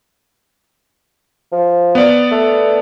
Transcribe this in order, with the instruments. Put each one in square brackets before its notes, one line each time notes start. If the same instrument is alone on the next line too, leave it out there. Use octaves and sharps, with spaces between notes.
[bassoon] F3
[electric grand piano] B3 D5
[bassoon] A3